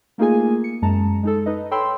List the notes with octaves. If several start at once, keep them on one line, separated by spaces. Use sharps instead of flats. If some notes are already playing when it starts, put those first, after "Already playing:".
A3 A#3 D#4 F4 G#4 G#5
C#7
F#2 G#3 A5 A#5
G#3 D#4 A4
D#4 B4 D#5
A4 C#5 G5 B5 C6 E6